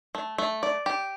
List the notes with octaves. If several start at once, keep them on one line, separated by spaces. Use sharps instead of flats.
A3
A3
D5
G4